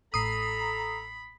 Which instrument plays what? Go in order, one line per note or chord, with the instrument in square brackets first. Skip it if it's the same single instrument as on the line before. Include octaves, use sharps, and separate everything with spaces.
[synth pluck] A1 A2 [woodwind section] A4 A#5 [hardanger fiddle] B5 [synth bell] D#6 C7